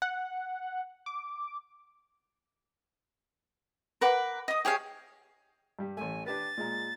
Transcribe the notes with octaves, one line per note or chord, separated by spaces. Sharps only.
F#5
D6
A#4 B4 F#5 D6
D#5 D#6
G4 G#4 C#5 F5
G2 G3
A1 A3 G#5
D4 G4 B4 A6
A#2 G#3 A#5